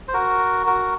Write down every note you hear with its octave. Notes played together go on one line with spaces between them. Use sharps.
C5
F#4 A#4
F#4 A#4